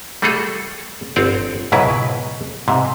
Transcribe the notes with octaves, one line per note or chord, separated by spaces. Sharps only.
G3 A3 F#4 G#4 A4
G1 C4 F#4 C#5 D5
C#2 G#2 B2 F#3 E4 B4
G#2 C3